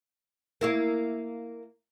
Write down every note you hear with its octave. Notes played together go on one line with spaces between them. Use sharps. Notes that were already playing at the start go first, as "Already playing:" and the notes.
A#3 E4 A#4